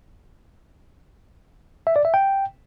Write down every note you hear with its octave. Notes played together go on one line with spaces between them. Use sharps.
E5
D5
E5
G5